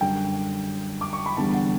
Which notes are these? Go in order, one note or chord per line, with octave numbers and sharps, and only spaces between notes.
F#2 D3 G3 G5
D6
C#6
B5
E2 D3 G3 A5
F#5